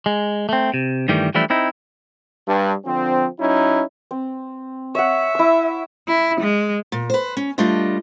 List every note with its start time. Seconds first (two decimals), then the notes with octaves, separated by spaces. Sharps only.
0.06 G#3
0.49 A3 C4
0.74 C3
1.08 G2 D#3 E3 G3 A3
1.34 E3 F3 G3 A3 D4 E4
1.50 C4 D#4 E4
2.48 G2
2.85 D3 F3 C4
3.40 F#3 C#4 D#4 E4
4.11 C4
4.95 C#5 E5 F#5
5.35 E4 E6
6.08 E4
6.40 G#3
6.92 A#2
7.10 B4 C5
7.37 C#4
7.58 G3 A3 D4 F4 D#5